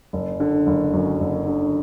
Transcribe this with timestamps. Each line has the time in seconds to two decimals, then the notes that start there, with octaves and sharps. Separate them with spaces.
0.13 F#1
0.40 D3
0.67 F#1
0.94 F#2
1.20 F#1
1.47 D3